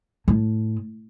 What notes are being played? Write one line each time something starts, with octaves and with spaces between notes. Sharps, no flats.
A2